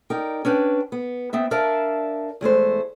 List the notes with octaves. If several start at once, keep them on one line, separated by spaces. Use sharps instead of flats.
D#4 A#4 D5 G5
C#4 D4 B4 G5
B3
B3 C4 E5
D4 A#4 D5 E5 F5 A5
E2 G#3 A3 C5